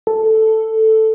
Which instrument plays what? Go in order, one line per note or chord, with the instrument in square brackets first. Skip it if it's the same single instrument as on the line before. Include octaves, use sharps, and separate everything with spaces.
[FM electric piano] A4